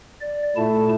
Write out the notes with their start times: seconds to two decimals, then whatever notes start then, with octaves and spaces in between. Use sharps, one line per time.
0.21 D5
0.56 A#2 A3 E4 A5